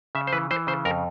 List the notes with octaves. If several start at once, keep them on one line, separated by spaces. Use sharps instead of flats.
C#3 E5
C5
E3 B4
E3 C5
C#3 C5
F2 A#4